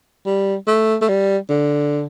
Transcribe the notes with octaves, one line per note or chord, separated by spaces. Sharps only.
G3
A3
A3
G3
D3